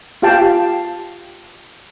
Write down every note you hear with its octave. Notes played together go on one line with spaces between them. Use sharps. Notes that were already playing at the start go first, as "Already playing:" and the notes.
F4 G4 F5 G5 A5